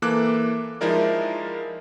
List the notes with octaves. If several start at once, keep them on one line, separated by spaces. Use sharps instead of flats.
E3 A#3 A4 D6 F#6
F3 G#3 D#4 E4 A#4 D5